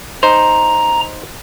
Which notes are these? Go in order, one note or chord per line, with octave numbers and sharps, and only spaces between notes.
D#4 C5 A#5